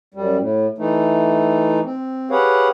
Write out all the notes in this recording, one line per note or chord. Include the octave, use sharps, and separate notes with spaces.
F#2 G3
A2
E3 A3 D#4
C4
G4 G#4 B4 C#5 F5 F#5